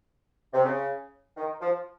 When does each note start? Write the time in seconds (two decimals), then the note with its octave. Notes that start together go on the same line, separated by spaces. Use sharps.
0.54 C3
0.65 C#3
1.37 D#3
1.61 F3